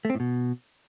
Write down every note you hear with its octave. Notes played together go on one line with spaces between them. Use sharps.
A3
C4
A2
B2